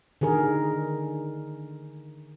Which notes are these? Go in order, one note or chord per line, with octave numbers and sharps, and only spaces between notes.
D3 D#3 G#4 A#4